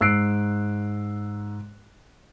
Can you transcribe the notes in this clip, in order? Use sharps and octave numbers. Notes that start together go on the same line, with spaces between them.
G#2 E6 F#6 C7 D7